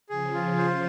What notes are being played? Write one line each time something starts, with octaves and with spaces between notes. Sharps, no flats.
C#3 F3 G#4
F4
C5